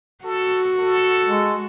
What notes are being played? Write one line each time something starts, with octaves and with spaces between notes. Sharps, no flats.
F#4 A4
A4
G#3